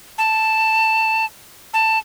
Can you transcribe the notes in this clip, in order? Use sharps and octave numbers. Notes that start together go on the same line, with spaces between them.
A5
A5